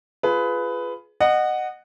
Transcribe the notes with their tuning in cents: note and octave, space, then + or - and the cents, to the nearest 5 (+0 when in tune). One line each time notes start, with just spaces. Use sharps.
F4 +0 G#4 +25 B4 +10
D#5 -25 F#5 +0